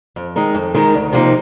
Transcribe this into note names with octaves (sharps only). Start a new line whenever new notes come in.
F2
D#3 G#3 D#4 A#4
F2
D#3 G#3 D#4 A#4
D2
C3 F3 A#3 D#4